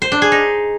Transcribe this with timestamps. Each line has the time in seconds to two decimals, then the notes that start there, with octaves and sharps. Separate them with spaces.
0.02 C5
0.12 D4
0.22 G#4
0.32 D#4